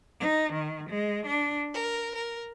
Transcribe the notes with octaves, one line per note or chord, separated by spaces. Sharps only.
D#4
D#3
G#3
D4
A#4
A#4